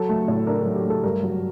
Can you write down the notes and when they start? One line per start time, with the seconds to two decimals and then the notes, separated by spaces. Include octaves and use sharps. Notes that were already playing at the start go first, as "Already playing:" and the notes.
Already playing: F#3 A4
0.09 A3
0.28 A2
0.47 D4 A#4
0.61 A4
0.66 F#3
0.75 G4
0.85 A3 A4
1.03 G2 A#4
1.23 F#3